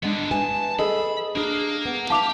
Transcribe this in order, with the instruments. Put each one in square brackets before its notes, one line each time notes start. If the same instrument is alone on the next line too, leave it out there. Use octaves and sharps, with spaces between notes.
[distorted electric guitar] D3 B3 [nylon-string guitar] G#3 D4
[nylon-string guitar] B4 E5 G#5 [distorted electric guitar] A5
[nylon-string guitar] G#4 A4 [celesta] D#5 [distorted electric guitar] B5
[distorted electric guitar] A#3 A#4 [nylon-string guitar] D4 G#4
[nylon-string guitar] B3
[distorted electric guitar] G4 [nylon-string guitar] E5 F5 [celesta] A5 D6 F7